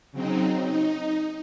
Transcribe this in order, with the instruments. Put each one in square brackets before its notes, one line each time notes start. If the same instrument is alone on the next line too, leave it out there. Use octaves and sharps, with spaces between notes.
[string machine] C#3 F#3 C4 D#4
D#4